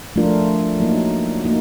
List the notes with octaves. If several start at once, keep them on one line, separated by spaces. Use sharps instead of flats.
F3 A3 D4 F4 A#4
F#3 A#3 D#4
A#3 D#4